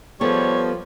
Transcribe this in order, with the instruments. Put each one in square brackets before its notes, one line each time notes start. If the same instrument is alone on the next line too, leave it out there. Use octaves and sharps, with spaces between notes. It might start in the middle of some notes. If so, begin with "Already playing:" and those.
[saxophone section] F3 G3 [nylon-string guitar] B3 G#4 A4 [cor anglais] C#5